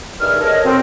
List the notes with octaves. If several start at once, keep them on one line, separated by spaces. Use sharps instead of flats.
G2 D#3 G#4 E5 F6
A4 A#4 C#5 D#5
B2 C4